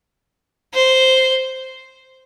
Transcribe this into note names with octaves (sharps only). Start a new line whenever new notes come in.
C5